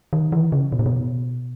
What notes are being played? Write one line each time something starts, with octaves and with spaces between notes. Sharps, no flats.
D#3
E3
C#3
B2
A#2
B2